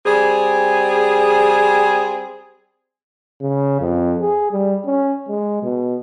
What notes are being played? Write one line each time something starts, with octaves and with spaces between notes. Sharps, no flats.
G3 C4 G#4
C#3
F2
G#4
G3
C#4
G#3
B2